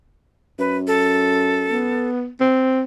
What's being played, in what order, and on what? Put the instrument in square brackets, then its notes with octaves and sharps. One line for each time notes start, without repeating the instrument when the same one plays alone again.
[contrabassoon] F#2 [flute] B4
[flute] A4
[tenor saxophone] B3
C4